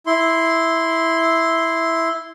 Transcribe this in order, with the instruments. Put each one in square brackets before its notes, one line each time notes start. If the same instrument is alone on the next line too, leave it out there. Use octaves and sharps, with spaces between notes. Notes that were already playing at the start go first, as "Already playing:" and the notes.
[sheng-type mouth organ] E4 C6